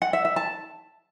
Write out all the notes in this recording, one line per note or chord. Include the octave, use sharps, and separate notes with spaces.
F#5
E5
E5
A5